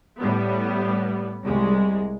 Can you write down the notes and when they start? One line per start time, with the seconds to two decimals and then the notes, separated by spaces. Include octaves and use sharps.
0.18 A2 G3 B3
1.44 C2 G#3